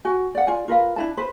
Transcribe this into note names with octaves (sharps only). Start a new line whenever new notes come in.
F#4 G#5
D5 F#5
F4 D5 G#5
F4 A#4 B4 F5
D4 E4 A5
B4 C5